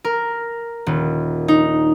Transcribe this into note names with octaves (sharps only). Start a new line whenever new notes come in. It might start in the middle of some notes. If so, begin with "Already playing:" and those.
A#4
D#1
D#4